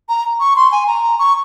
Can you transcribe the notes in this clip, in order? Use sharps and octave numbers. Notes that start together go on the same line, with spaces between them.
A#5
C#6
C6
G#5
A#5
C#6